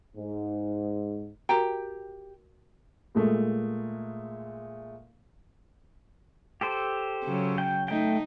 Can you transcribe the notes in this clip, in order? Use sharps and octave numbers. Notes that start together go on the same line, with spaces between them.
G#2
F#4 G4 A#4 G5 A#5
A#2 G#3 A3
G4 A4 C5
C#3 F#3
G5
A3 D#4 G5